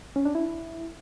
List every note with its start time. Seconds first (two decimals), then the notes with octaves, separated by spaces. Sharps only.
0.16 C#4
0.25 D4
0.35 E4